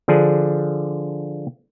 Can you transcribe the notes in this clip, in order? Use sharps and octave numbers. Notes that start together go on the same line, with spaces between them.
D3 F3 D4 G#4